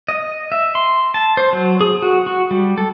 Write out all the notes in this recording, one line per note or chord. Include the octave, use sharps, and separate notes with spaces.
D#5
E5
C6
A5
C5
F#3
G#4
F#4
F#4
G3
A4